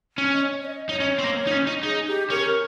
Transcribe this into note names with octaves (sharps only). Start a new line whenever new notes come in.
C#4
D#5
C#5
C#5
D#5
D#4 C#5
C#4
C4
A#3
D#4
C#4
D#4
D#4 G#4
G4
C#4 A#4